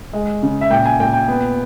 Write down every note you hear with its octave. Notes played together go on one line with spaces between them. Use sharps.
G#3
C#3
E5
A#2 G5
G#5
A#2 G5
G5
B3